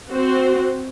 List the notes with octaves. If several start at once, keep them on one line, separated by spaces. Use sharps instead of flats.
C4 F#4 C5